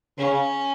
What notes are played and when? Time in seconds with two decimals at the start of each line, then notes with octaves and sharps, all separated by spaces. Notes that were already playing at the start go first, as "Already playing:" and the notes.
0.18 C#3 C#4